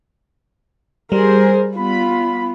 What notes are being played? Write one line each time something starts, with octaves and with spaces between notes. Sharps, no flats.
G3 G#4 A#4 C5
B3 F4 B5